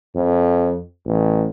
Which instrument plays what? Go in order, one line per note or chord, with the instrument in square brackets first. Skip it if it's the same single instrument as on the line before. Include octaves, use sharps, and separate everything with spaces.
[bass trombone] F2
A1